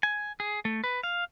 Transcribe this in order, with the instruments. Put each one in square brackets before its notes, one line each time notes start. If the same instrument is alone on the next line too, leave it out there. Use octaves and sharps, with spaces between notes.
[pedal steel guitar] G#5
G#4
A3
B4
F5